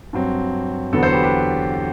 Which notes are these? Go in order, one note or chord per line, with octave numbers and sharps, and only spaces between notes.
G2 F#3 C4
E2 D3 F#3 B3 A4
A4 C5
G4 B4
G4 B4